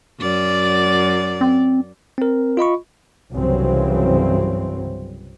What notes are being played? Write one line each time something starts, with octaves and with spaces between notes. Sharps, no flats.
F#2 D5
C4
C4 A#4
F4 D#5 B5 C#6
C2 G2 C#3 E3 F#3 C4